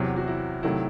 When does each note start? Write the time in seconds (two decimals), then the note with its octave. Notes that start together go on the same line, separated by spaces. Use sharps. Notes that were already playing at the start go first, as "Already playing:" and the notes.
Already playing: E2 C3 F#3 E4
0.16 F#4
0.28 E4
0.63 C3 D#3 F#3 A3 E4